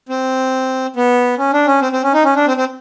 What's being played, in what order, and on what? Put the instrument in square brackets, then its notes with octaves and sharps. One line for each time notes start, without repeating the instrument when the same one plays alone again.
[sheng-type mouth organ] C4
B3
C#4
D4
C#4
C4
C4
C#4
D#4
C#4
D4
C4
C4